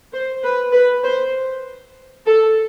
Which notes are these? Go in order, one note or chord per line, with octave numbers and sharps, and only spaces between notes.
C5
B4
B4
C5
A4